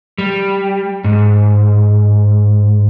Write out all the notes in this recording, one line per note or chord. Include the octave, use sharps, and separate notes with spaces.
G3
G#2